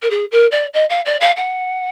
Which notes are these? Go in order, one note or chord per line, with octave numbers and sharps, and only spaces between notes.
A#4
G#4
A#4
D5
D#5
F5
D5
F5
F#5